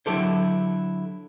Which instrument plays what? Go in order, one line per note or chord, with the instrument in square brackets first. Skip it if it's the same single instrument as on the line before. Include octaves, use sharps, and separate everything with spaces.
[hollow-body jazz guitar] D3 F#3 E4 G4 A4 C5